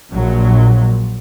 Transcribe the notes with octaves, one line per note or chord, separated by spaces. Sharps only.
A#1 A#2 F#3